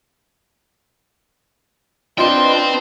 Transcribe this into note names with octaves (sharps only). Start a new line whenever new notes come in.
D4 F4 B4 C5 D#5 G5 C6